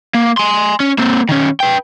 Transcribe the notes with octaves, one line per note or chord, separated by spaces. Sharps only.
A#3
G#5 C6
C#4
A#3 C4
D#3 C#4
B4 G5